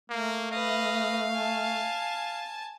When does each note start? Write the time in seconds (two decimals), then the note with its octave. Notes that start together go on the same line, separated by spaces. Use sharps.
0.10 A3 A#3
0.52 B4 D#5 F5
1.34 G#5 A5